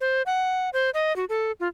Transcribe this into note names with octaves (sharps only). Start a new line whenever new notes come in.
C5
F#5
C5
D#5
F#4
A4
F4